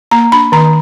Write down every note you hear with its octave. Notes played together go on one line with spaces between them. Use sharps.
A#3 A#5
D4 B5
D#3 A#5